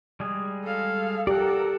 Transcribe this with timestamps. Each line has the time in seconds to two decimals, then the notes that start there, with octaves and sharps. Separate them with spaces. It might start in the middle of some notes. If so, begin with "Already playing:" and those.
0.20 G3 G#3 G#4
0.64 A4 F5
1.27 G4 A4 A#4 D5 F#5